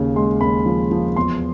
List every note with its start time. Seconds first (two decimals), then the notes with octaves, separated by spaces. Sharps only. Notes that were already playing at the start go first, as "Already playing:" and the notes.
Already playing: D#2 C#3
0.16 G#3 C6
0.41 D#2 B5
0.66 F3
0.91 F3
1.16 E2 C6